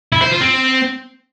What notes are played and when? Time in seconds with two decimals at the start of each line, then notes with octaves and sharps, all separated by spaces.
0.12 E4
0.22 C5
0.31 F4
0.41 C4